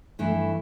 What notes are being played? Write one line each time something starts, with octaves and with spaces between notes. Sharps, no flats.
G2 E3 A3 E4